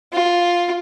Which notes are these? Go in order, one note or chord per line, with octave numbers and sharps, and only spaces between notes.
F4